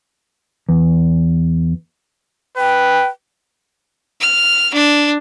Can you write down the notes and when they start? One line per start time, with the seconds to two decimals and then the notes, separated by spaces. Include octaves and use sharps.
0.69 E2
2.57 B4 G5
4.20 F6
4.74 D4